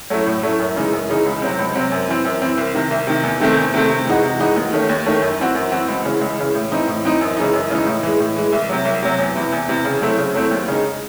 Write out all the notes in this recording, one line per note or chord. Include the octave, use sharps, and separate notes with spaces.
F#3 A3 C#4 E4
A2
F#3 A3 C#4 E4
F#2
C#3 E3 G#3 D#4
F#2
C#3 E3 G#3 D#4
C#2
C3 F#3 C4
C#2
C3 F#3 C4
F#2
E3 C4
F#2
E3 C4
C2
C3 D#3
C2
C3 D#3
E2
C3 D#3 A3 C4
E2
C3 D#3 A3 C4
C3
E3 G#3 D#4 F#4
C3
E3 G#3 D#4 F#4
D#2
D#3 A3 C#4
D#2
D#3 A3 C#4
F#2
E3 C4 F#4
F#2
E3 C4 F#4
C#2
C#3 E3 G#3
C#2
C#3 E3 G#3
A2
E3 C4 D#4
A2
E3 C4 D#4
F#2
C#3 E3 G#3 D#4
F#2
C#3 E3 G#3 D#4
A2
E3 G#3
A2
E3 G#3
C2
C3 F#3
C2
C3 F#3
E2
C3 E3
E2
C3 E3
C#3
F#3 A3 C4 E4
C#3
F#3 A3 C4 E4
D#2
C#3 G#3 D#4